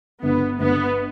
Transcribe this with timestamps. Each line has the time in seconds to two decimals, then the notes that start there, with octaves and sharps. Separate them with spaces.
0.23 G1 B3
0.60 G1 B3